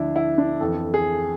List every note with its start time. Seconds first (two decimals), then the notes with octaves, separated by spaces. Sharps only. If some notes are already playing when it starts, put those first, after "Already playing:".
Already playing: D2 D3 F3 D4 E4
0.16 E4
0.38 D4
0.60 F2 E3 A4
0.94 G#4